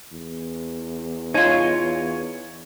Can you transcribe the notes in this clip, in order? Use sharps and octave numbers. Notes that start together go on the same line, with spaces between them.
E2
D#4 F4 C#5 G#5